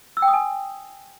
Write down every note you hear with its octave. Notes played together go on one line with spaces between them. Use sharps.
E6
G5
D#6
G#5